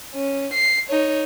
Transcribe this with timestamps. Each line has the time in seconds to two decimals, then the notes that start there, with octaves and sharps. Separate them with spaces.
0.15 C#4
0.54 C7
0.90 D#4 C#5